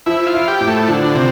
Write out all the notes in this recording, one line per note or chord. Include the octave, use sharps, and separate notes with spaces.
F3 E4
F4
E4
G4
A2
A3
D3 F3
C3